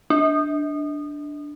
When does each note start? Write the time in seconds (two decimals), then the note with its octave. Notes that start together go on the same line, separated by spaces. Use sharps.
0.10 D4